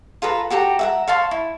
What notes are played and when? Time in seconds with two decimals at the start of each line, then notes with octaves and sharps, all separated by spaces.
0.22 F4 A4 B4 A#5
0.50 F#4 G4 A4 A#5
0.79 E5 F#5 A#5
1.08 C#5 F5 A5 C6
1.31 E4